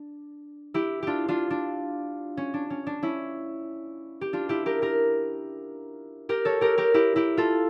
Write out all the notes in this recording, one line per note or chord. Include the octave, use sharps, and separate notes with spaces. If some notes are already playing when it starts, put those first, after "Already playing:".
Already playing: D4
E4 G4
D4 F4 G4
D4 F4
D4
C#4
D4
C#4
D4
C#4 E4
G4
D4 F4
E4 G4
G4 A#4
G4 A#4
G4 A#4
A4 C#5
G4 A#4
G4 A#4
E4 G4
E4 G4
F4 A4